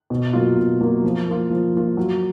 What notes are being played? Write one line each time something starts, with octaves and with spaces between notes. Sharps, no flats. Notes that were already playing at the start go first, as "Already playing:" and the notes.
B2
F#3 A#3 F4
B2
F#3 A#3 F4
F3
A#3 F4
F3
A#3 F4
F#3